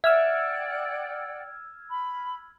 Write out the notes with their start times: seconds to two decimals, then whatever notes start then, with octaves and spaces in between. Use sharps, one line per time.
0.04 D5 E5 F#5 G5 E6 F6 G#6
1.90 B5